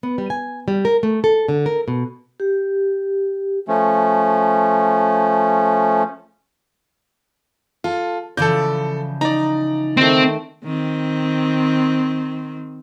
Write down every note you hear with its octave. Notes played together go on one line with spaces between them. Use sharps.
B3
G3
G#5
G3
A#4
A3
A4
D3
A#4
B2
G4
F3 A3 C#4
F4 A4
C#3 E3 F3 A4 D5 G6
D#4 D5 A#5
D#3 A3 C4
D#3 C4